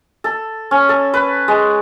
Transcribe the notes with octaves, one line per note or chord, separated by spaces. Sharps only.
A4
C#4
A4
B4
G#3